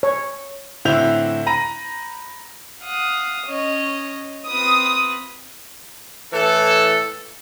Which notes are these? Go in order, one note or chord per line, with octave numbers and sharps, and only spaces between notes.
C#5
A2 D3 C4 E4 G6 F7
A#5 B5 A#6 D#7
F5 F#5 D#6
C#4 C#5 D#5
C4 F4 B4 D#6
A2 E3 A4